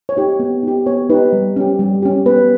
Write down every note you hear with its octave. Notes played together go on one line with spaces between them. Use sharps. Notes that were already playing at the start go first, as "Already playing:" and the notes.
C#5
D#4 G4
B3
D#4 G4
B3 C#5
D#4 G4 B4
G3
C#4 G4
G3
C#4 G4
B3 B4